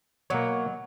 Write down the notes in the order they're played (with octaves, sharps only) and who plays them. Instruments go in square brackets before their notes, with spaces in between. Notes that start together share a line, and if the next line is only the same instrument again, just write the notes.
[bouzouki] B2 F#3 A#4 [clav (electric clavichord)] A#3 C#5